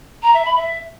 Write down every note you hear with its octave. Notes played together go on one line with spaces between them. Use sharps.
A#5
E5
B5
E5